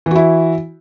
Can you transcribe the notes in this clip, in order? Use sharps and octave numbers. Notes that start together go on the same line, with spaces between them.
E3 E4 F#4